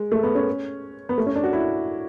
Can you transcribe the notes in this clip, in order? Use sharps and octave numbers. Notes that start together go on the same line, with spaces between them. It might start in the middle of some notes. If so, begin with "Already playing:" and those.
Already playing: G#3
A3
B3
C#4
B3
A3
C#4
D4
F#4
E4